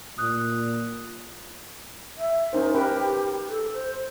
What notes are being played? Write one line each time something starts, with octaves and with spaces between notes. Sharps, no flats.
A#2 D#6 F#6
E5
C#4 D#4 A#4 C5
G4 A#4 B4 G5
A4
C5